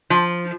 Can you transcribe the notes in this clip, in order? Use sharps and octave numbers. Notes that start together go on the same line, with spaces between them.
F3